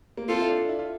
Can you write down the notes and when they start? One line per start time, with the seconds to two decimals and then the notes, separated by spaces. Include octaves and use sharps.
0.17 A#3
0.28 C4 F4 A4
0.42 E4
0.48 D4
0.69 E4
0.79 F4